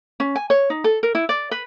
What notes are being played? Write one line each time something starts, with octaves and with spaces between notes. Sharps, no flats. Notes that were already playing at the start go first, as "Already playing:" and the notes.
C#4
G#5
C#5
D#4
A4
A#4
E4
D5
B4